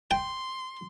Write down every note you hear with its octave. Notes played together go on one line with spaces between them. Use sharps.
G5 C6